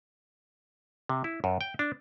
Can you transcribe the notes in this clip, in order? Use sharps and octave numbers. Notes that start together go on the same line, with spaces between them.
C3
E4
F#2
G5
D4